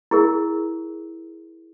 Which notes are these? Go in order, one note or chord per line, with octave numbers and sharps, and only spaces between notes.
E4 G#4 A#4